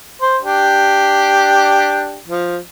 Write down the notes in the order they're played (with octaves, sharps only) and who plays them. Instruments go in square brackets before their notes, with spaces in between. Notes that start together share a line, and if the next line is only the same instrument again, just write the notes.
[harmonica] C5
D4 G4
F3